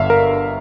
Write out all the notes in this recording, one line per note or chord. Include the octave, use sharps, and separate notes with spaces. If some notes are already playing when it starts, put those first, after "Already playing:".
Already playing: G1 G2 D3 E5 F5
A#4